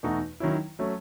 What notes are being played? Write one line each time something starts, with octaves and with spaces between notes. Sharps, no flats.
E2 B2 A3 D#4 F#4
D#3 F#3 C#4 E4
F#3 A3 C#4